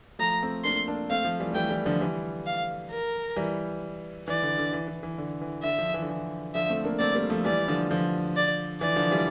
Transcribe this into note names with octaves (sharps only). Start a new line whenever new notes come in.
F3 A3 A#5
A3 C4
A#3 D4 C6
A#3 D4
A3 C4 F5
F3 A3
E3 G3
A3
E3 G3 G5
E3 G3
D3 F3
E3 G3
F5
A#4
E3 G3
E3 D5
D3
D3
E3
E3
E3
D3
E3
D3 E5
D3 F3
E3
D3
E3
D3 F3 E5
A3 C4
A#3 D4
A3 C4 D5
G3 A#3
F3 A3
E3 G3 D5
D3 F3
D3 F3
D5
E3 D5
D3 F3
E3 G3